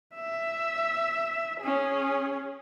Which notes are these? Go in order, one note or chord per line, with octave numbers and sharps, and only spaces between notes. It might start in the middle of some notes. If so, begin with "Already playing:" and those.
E5
C#4 G#4